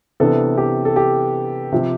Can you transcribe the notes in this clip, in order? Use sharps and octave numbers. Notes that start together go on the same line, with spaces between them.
C3 E3 B3 D4 A4
G4
A4
G4
C3 F3 C4